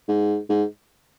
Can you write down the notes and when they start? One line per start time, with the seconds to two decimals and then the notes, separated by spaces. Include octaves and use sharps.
0.08 G#2
0.49 G#2